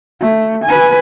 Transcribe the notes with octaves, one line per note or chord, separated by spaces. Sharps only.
A3
B4 G#5